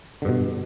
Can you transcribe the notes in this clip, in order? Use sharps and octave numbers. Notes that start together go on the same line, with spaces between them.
G2 B2 D3